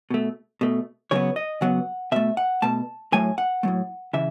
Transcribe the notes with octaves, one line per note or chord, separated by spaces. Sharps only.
B2 A3
B2 A3
C#3 F#3 B3 C#5
D#5
C#3 F#3 B3 F#5
B2 A3 E5
F#5
B2 A3 A5
A2 F#3 A3 G#5
F#5
A2 F#3 A3
C#3 E3 E5